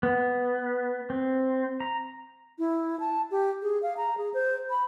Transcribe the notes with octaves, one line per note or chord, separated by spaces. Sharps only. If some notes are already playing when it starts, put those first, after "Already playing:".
B3
C4
A#5
E4
A5
G4
G#4
F5
A#5
G#4
C5
B5